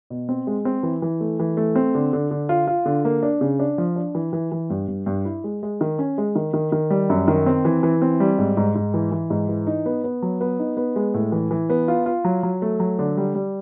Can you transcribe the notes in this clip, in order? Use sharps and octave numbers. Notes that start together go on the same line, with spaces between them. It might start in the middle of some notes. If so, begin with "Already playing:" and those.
B2
C4
G#3
C4
E3
E3
A3
E3
A3
C4
D3
D3
D3
F4
F4
D3
A#3
D4
C#3
D4
F3
D4
E3
E3
E3
G2
G2
G2
E4
G#3
G#3
D#3
C#4
G#3
D#3
D#3
D#3
G3
F#2
D#3
C4
E3
E3
C4
G3
G#2
G#2
G#2
E3
E3
G#2
E3
D#4
B3
B3
F#3
B3
D#4
B3
G#3
A2
E3
E3
B3
F4
F4
F#3
F#3
A3
F#3
D3
G3
G3